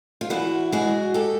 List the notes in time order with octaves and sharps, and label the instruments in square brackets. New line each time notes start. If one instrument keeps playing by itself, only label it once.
[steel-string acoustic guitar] F4
E2 E4 F#4
G#3 F#4 G#4
G4 A4